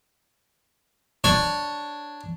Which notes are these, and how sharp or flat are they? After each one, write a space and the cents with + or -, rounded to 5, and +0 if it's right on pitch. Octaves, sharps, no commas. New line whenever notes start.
D4 +0 C#5 +0